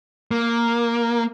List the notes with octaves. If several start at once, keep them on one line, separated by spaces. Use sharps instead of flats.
A#3